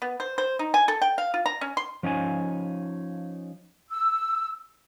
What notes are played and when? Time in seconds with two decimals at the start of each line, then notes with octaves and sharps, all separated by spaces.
0.02 B3
0.20 C5
0.38 C5
0.59 D#4
0.74 G#5
0.88 A4
1.02 G5
1.18 F5
1.34 F4
1.46 A#5
1.61 C#4
1.77 C6
2.03 F3 C#4 D#4 G#5
3.89 E6